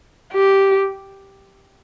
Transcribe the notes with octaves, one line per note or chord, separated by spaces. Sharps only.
G4